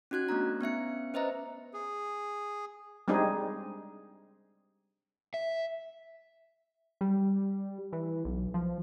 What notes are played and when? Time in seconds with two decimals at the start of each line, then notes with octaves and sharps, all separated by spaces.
0.11 C#4 D#4 F#4 F#6 G#6
0.29 A3 B3 D4 A#5
0.61 B3 C#4 E5 C#7
1.14 C#4 B4 C5 D#5 E5 A#5
1.74 G#4
3.08 G3 G#3 C4 D4 D#4 G#4
5.34 E5
7.01 G3
7.93 E3
8.25 B1
8.54 F3